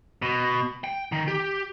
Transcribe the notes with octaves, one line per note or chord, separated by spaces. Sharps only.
B2
G5
D#3
G4